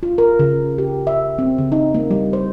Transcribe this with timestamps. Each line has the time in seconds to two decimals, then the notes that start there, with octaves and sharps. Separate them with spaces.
0.03 F4
0.18 A#4
0.39 C#3
0.78 G4
1.07 E5
1.39 C4
1.58 C#3
1.72 D#4
1.94 A#3
2.11 G3
2.33 C5